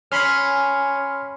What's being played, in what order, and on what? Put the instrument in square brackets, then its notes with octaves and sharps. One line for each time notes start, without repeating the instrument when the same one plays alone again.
[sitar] C#4 [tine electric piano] B5 C6 F6